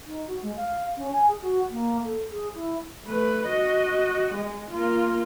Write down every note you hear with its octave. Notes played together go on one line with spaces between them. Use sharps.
D#4
F#4
G#3
F5
C#4
G#5
G#4
F#4
A#3
A4
G#4
E4
A3 B4
F#4 D#5
G#3
A#3 F4